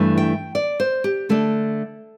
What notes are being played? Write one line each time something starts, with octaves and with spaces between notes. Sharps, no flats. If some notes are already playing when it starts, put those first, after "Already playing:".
Already playing: G2 E3 A3 D4
G5
D5
C5
G4
D3 A3 D4 A4